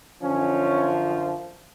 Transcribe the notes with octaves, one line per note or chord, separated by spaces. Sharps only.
F#2 D3 F3 C#4